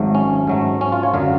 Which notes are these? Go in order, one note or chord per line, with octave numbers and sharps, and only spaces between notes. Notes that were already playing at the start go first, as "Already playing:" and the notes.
Already playing: G#1 G#2 F#3 A3
C#4
G#2 F#3 A3
C#4
F4
C#5
F#2 D3 F#3 F5